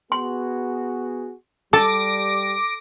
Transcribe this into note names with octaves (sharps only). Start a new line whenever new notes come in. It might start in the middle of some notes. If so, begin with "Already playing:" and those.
B3 F#4 G#4 C6
G3 A4 A5 D6 A#6